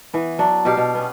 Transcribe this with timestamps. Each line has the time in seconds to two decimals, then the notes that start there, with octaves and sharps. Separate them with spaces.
0.14 E3 B3
0.38 F#3 D4
0.65 B2 G4 F5
0.77 B2
0.95 B3 C#4